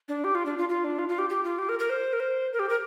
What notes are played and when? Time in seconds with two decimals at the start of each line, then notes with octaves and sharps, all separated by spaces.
0.08 D4
0.24 G4
0.35 F4
0.46 D4
0.58 F4
0.69 F4
0.84 D4
0.99 F4
1.09 F4
1.19 G4
1.29 G4
1.44 F4
1.59 G4
1.69 A#4
1.79 A#4
1.90 C5
2.13 A#4
2.20 C5
2.53 A#4
2.59 G4
2.69 A#4